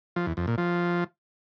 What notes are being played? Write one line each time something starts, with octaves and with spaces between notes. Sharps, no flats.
F3
E2
F2
A#2
F3